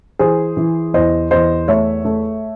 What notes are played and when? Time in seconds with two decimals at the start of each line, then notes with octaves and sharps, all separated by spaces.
0.19 E3 G#4 C5
0.57 E3
0.94 E2 C5 D#5
1.31 E2 C5 D#5
1.68 A3 C#5 E5
2.05 A3